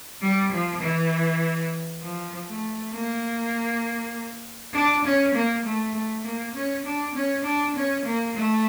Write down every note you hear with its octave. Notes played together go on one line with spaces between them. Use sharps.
G3
F3
E3
F3
A3
A#3
D4
C#4
A#3
A3
A3
A#3
C#4
D4
C#4
D4
C#4
A#3
A3